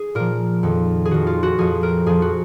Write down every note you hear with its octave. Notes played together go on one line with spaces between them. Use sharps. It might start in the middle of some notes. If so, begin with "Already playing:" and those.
Already playing: G#4
A#2 F3 A#4
F2 D#3
G#4
F2 D#3 F#4
F4
F#4
F2 F3 G#4
A#4
F2 F3 G#4
F#4